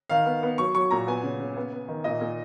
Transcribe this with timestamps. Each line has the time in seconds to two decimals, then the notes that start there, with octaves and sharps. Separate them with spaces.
0.10 D#3 F5
0.26 B3
0.43 B3
0.58 F#3 C#6
0.75 F#3 C#6
0.91 A#2 A#5
1.07 B3 G#5
1.23 C#3
1.39 C#3
1.57 B3
1.73 B3
1.88 D#3
2.04 A#2 D#5
2.21 A#2